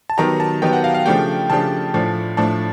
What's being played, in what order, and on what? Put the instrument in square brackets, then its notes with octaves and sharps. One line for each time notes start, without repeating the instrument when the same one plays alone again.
[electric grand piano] A5
[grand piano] D#3 F#3 B3 D#4 G4 [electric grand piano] A#5
[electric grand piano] A5
[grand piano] D#3 F#3 B3 D#4 G4 [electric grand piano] G5
[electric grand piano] F#5
F5
F5
[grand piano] C#3 F3 A3 D4 G4 [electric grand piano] G5
[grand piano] C#3 F3 A3 D4 G4 [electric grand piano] A5
[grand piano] A2 F3 A3 D4
[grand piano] A2 F3 A3 D4 [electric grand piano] A5